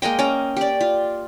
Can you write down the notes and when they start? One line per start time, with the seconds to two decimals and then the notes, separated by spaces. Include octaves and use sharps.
0.02 G#3 A#3 D#5 G5
0.19 C#4 G5 A#5
0.57 G4 D5
0.81 F4